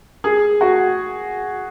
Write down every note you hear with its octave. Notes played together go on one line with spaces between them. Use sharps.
G#4
F#4